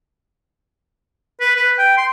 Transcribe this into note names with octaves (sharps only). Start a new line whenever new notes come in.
B4
B4
G5
C6